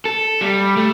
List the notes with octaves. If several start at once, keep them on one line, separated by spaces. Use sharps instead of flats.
A4
G3
A3